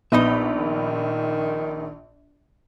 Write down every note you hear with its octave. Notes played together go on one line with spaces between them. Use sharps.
A#1 B3 D#4 D#5 E5 B5
D#3